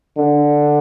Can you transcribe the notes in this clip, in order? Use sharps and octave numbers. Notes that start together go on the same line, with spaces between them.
D3